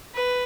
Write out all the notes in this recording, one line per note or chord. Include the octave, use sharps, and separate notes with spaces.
B4